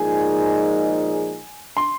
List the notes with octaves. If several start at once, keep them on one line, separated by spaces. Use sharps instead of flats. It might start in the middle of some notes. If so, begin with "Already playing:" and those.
Already playing: A#2 F3 G#3 D#4 G#4 G#5
C6